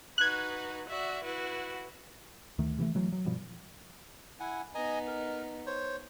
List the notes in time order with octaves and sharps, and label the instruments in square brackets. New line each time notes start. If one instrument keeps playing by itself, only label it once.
[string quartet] D#4 F#4 B4 [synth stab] F#6 G#6
[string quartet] F#4 D5 E5
E4 F#4 B4
[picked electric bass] D2 D#3 A3
C3 E3 F3 A3
E3 F#3 A3
F#3
G2 B2 F3 G3
[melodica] E4 F#5 G#5
[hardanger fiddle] B3 D#4 [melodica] D#5 G#5 A#5
[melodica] A#4
C5 C#5